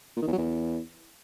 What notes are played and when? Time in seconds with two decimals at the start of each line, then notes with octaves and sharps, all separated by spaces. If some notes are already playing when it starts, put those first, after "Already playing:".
0.17 A#2
0.22 D#3
0.27 E2
0.33 F#3
0.38 E2